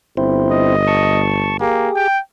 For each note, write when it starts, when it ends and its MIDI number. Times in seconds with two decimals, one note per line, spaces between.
0.17 1.62 31
0.17 0.76 60
0.17 0.76 64
0.17 0.76 72
0.51 1.22 75
0.88 1.57 81
0.88 1.57 85
1.61 1.89 58
1.61 2.08 67
1.61 2.08 68
1.96 2.19 79